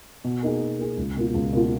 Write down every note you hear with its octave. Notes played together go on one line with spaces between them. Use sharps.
B2
A#3 D#4 G#4
B2
A#3 D#4 G#4
C#2
B2 A#3 F4
C#2
B2 A#3 F4